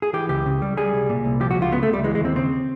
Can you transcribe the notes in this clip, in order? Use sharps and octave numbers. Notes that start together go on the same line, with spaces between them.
G#4
E3 G4
C#2 G4
C#3
G3
G3 G#4
C2
A#2
C2
F3 G4
F#4
C#2
F4
C#3 B3
A3
C#2
G3
E3 G#3
G#3
D#2 C4
C#3 C4